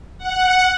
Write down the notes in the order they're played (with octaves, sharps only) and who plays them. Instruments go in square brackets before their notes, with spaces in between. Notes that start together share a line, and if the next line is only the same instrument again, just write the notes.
[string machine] F#5